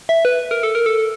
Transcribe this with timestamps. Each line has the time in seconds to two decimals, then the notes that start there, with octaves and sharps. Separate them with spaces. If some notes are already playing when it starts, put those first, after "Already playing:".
0.09 E5
0.25 B4
0.51 A#4
0.63 A4
0.75 A#4
0.86 A4